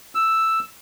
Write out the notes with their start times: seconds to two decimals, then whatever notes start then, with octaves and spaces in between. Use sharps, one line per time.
0.15 E6